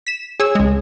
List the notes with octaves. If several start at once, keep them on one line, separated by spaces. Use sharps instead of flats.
B6 E7
G#4 C#5 E6
C#2 G#3